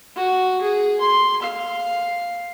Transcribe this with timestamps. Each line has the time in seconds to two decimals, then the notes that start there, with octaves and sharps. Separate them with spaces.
0.16 F#4
0.61 G#4
1.01 C6
1.42 F5